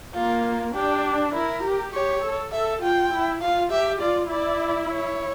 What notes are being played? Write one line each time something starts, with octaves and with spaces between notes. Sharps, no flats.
A#3 F4
D4 G4
E4 A#4
G4
G4 C#5
A4
A4 E5
F4 G5
E4
F4 F5
G4 E5
F4 D5
E4 D5
C#5